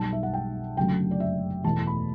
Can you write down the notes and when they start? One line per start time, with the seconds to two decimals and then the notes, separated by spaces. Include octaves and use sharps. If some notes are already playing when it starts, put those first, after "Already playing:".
Already playing: B1 B2 G3 A5
0.13 E5
0.23 F#5
0.33 G5
0.77 F#1 F#2 D3 F#3 A3 G5
1.11 D5
1.20 E5
1.64 E2 B2 A3 A5
1.87 B5